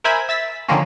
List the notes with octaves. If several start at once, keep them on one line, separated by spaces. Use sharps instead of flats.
A#4 C5 E5 G#5 B5
E5 A6 B6
D3 D#3 F3 A#3 C#4